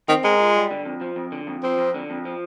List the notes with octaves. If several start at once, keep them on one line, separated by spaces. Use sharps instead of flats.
D#3 C4
G#3 A#4
F4
G3
D3
F2
F3
F2
D3
F2
F3 C4
F2
D3
F2
F3